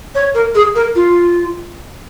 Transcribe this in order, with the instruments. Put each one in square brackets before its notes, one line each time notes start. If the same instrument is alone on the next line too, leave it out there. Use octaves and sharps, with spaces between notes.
[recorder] C#5
A#4
G#4
A#4
F4